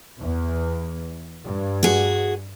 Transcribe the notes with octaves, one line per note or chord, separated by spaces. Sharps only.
E2
G2
F#4 G#4